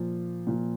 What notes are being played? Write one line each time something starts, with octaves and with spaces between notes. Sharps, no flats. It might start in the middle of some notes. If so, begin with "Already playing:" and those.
Already playing: A#2 F3
A#2 F3